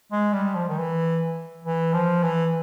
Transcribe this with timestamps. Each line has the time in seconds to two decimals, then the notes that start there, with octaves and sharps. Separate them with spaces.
0.12 G#3
0.33 G3
0.55 F3
0.69 D#3
0.78 E3
1.65 E3
1.93 F3
2.23 E3